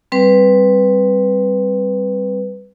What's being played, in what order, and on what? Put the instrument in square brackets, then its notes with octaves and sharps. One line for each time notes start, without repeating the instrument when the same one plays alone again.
[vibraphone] G3 C4 B4